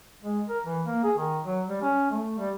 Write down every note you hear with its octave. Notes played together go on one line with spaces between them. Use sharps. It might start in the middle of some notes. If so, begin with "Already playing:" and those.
G#3
A#4
E3
A#3
G#4
D#3
F#3
G3
C#4
A3
G3